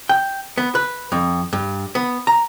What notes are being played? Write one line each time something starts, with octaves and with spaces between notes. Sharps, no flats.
G5
B3
B4
F2
G2
B3
A#5